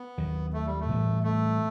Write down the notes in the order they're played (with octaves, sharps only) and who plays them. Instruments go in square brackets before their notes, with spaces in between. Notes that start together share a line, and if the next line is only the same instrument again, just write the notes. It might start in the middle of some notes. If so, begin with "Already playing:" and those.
Already playing: [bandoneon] B3
[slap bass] D#2 D#3 F#3
[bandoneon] A3
G3
A3
[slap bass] A2 E3 G3 B3
[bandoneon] A3